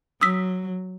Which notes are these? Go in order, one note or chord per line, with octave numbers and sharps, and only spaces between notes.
F#3 D#6 E6 B6